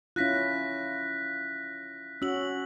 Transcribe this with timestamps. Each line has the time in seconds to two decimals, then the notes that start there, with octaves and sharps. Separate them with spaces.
0.16 C#4 E4 F4 F#6 A#6 B6
2.22 C#4 F#4 E6 F#7